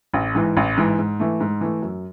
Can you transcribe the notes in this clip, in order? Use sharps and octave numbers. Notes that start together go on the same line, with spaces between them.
A1
G#2 E3
A1
G#2 E3
G#2
E3 A3
G#2
E3 A3
F#2